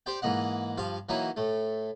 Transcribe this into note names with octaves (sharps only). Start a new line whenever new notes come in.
G4 C5 D5 G5
G#2 E3 A#3 D#5 F#5
G2 F3 F5
E3 F#3 A#3 D#4 E4
A2 A3